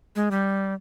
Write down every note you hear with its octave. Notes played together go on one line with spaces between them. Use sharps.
G#3
G3